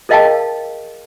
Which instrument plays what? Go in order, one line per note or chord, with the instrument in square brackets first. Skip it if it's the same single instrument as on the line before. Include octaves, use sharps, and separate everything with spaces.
[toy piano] G#4 A#4 D#5 F5 G5 A5